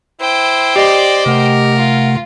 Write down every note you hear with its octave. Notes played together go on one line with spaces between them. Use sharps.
E4 C5 G5
G4 D5 D#5
C3 A3 A#4 F#5
F4